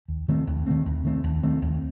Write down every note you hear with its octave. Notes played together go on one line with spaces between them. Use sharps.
D#2
D#3 A3 C4
D#2
D#3 A3 C4
D#2
D#3 A3 C4
D#2
D#3 A3 C4
D#2